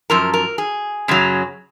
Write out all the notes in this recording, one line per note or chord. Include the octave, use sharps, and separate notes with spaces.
F#2 F3 A#4
A#4
G#4
F#2 C#3 F#3